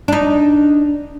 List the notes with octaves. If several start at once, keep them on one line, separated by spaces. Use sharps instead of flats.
D4 D#4